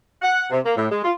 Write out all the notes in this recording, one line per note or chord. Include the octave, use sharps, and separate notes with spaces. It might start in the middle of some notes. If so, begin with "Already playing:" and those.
F#5
C3
A#3
A2
G#3
F4